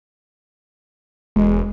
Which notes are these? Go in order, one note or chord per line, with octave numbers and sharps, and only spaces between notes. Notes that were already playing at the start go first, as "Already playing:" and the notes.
E1 G#3